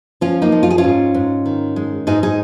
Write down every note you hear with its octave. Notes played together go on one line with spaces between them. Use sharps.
F3 C#4 F4
A#3 D#4
F3
F4
G#4
C#4 F4
G#2
G#2
D#3
G#3
G#2 D#4 G#4
D#4 G#4